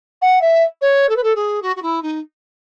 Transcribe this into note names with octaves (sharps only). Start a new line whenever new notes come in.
F#5
E5
C#5
A4
B4
A4
G#4
F#4
F#4
E4
D#4